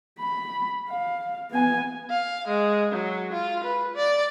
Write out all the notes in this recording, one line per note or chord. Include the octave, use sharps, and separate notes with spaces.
B5
F5
B3 G#5
F5
G#3
F#3
F4
B4
D5